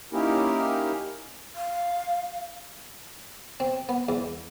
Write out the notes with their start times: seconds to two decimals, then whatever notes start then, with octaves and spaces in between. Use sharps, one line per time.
0.13 A#3 C#4 D#4 E4 G4 A#4
1.55 F5
3.60 C4
3.89 B3
4.09 E2